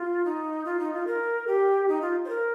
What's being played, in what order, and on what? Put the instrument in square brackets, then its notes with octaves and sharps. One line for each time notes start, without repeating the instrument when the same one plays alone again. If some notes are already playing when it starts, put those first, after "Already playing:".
Already playing: [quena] F4
D#4
F4
D#4
F4
A#4
G4
D#4
F4
C5
A#4